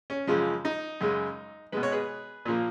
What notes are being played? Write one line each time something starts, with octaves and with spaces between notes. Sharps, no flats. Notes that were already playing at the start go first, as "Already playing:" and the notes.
C#4
F#2 C#3 F3 G#3
D#4
F#2 C#3 G#3
B2 G#3 B4
C#5
G#4 B4
A#2 F3 A#3